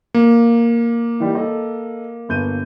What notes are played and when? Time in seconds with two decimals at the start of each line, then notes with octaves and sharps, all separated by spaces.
0.14 A#3
1.20 E3 G3 D#4
1.35 A4 D#5
2.29 G1 G6 D#7